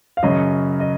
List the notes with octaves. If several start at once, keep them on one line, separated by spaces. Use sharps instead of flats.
F5
F#2 C#3 F#3 D#5
D#5